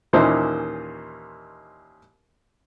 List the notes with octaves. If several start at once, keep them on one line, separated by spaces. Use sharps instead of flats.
D#2 A#2 E3 C#4 D#4 C5